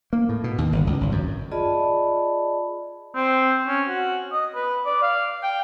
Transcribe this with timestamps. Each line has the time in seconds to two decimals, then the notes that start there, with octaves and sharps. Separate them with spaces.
0.13 A#3
0.29 A2
0.44 B2
0.58 D#2
0.72 G1
0.87 C#2
1.01 G#1
1.12 F#2
1.52 F4 G#4 D5 D#5 A5 B5
3.15 C4
3.67 C#4
3.88 F#4
4.32 D#5
4.55 B4
4.85 D5
5.02 F5
5.43 G5